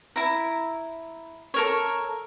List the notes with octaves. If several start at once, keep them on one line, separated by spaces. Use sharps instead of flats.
E4 A#5
A4 A#4 C#5